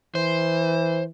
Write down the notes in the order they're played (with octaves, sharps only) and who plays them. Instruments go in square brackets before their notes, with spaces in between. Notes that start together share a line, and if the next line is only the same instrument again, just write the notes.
[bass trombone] E3 [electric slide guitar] C5